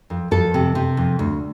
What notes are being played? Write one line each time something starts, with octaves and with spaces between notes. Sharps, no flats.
F2
F2 A4
C3
C3
F2
D2